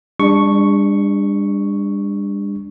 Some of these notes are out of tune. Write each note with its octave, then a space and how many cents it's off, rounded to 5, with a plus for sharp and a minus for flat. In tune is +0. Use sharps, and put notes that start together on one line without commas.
G3 +45 D4 +0 C#6 +0